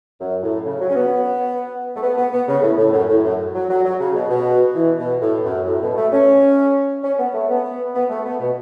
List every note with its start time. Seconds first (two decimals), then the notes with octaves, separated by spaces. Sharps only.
0.20 F#2
0.43 A2
0.65 C#3
0.80 F#3
0.89 C#4
0.95 B3
1.96 A3
2.02 B3
2.17 B3
2.33 B3
2.47 C#3
2.62 A2
2.78 A2
2.93 F#2
3.09 A2
3.24 F#2
3.54 F#3
3.70 F#3
3.85 F#3
4.00 C#3
4.15 B2
4.30 B2
4.75 E3
4.98 B2
5.21 A2
5.44 F#2
5.67 A2
5.82 B2
5.97 A3
6.13 C#4
7.03 C#4
7.18 B3
7.34 A3
7.49 B3
7.95 B3
8.09 A3
8.25 B3
8.40 B2